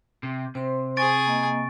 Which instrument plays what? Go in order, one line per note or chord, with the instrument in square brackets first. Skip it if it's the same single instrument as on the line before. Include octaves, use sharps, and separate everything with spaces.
[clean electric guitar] C3
[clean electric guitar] C3 [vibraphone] C5 C6
[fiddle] G#4 G#5 [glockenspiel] C#6 A6 D7
[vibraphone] A#3 D#5